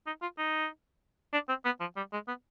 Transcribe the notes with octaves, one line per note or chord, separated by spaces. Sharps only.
D#4
F4
D#4
D4
C4
B3
F3
G3
G#3
B3